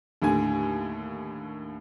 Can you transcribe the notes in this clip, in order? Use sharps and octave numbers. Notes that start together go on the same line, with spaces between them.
D#2 A2 D3 G#5